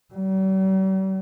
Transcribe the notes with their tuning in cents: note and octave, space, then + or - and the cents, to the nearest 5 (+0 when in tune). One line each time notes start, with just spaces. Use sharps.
G3 -45